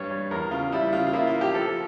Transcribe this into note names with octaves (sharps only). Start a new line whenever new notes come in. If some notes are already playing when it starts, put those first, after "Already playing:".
Already playing: G2 C#5
G3
E2 A#4
C#3 F4
G3 E4
C#3 F4
F4
A#3 E4
F4
A#3
G4
F3 A4